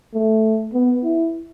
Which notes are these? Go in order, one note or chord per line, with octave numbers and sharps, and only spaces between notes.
A3
B3
E4